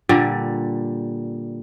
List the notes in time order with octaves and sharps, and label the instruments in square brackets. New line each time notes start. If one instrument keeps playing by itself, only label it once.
[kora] A#2 D3 G3